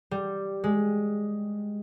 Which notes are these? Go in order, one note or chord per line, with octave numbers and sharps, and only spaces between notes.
G3
G#3